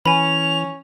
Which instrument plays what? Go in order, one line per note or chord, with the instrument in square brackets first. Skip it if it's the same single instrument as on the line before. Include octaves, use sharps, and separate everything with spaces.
[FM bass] E3 [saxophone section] C#4 [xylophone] G#5 B5 [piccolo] F7